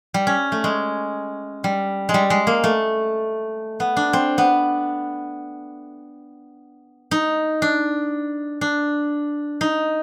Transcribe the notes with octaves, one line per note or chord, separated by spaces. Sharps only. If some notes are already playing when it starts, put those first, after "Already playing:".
G3
C#4
A3
G#3
G3
G#3
G3
G#3
A#3
A3
B3
D4
C4
B3
D#4
D4
D4
D#4